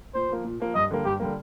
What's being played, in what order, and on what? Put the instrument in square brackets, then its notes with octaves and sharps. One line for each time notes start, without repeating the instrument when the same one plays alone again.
[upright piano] A#2 [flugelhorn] C5
[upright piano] F3 A#3
A#2
F3 A#3
[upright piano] G2 [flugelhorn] D#5
[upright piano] D3 G3 A#3
[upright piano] G2 [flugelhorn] G4
[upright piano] D3 G3 A#3